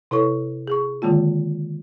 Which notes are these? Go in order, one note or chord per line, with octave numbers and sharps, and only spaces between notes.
C3 E4 A4 C#5 C#6
G#4 C#6
D3 D#3 G#3 A#3 F4